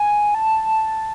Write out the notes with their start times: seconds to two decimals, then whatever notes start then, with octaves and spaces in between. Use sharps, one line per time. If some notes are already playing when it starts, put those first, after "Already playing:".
Already playing: G#5
0.35 A5